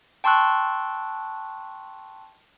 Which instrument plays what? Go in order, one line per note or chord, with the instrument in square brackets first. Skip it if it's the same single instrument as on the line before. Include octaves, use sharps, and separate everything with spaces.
[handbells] G5 A5 C6 C#6 E6 F#6